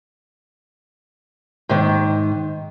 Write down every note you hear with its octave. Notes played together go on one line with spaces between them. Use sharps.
G#2 D#3